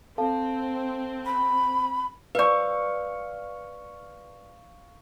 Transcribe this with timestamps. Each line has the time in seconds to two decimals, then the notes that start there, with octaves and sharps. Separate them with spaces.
0.18 C4 A4 F5 A5
1.25 B5
2.35 B4 D5 F5 C#6